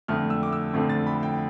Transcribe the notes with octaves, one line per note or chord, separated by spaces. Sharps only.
F2 D3 A3 C4 F6
E6
D6
E6
F2 D3 A3 C4
A6
B5
G5